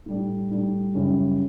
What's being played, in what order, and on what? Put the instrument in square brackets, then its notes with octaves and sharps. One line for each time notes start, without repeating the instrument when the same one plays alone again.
[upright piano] A2 G3 D4
A2 G3 D4
F#2 C#3 G3 C#4 E4